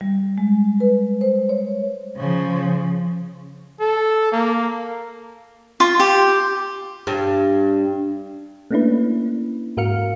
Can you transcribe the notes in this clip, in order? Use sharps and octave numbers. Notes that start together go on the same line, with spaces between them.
G3
G#3
B4
C5
C#5
C#3 F3
A4
A#3
F4
G4
G2
A3 A#3 C#4 D4 E4 B4
G#2 F#4 A#4 F5 F6 C#7